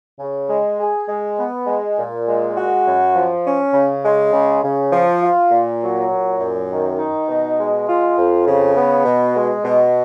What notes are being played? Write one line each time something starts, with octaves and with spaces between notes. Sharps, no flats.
C#3
G#3
G#4
G#3
B3
G#3
A#2
G#3
F#4
F#2
F3
C#4
C#3
G#3
C#3
C#3
F3
F4
A#2
F#3
A#2
F#2
D#3
D#4
B2
G#3
F4
F2
C#3
B3
B2
G#3
B2